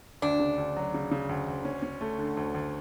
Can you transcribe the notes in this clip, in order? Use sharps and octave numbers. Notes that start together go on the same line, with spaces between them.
D2 D4
C#3
D2
F#3
C#3
C#3
D2
D2
C#4
C#4
A3
D3
D2
D2